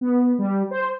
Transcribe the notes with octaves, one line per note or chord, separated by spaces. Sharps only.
B3
G3
C5